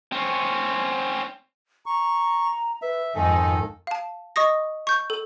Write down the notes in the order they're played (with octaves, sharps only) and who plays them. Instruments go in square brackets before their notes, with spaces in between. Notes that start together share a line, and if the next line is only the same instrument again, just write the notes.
[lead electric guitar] C4 C#4
[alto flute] A#5 [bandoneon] C#6
[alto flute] B4 [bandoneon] E5
[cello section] F2 G#2 D#4 [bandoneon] D#3 A4 [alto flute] G#5
[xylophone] F5 A5
D#5 C#6 D#6 A#6
C#6 G6
A4